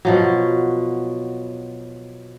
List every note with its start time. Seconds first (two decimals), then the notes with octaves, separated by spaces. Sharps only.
0.05 B2 F3 F#3